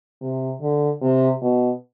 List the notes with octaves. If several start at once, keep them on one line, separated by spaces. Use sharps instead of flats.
C3
D3
C3
B2